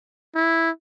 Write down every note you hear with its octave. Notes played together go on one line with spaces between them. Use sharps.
E4